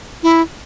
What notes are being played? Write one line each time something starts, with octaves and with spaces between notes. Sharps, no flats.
E4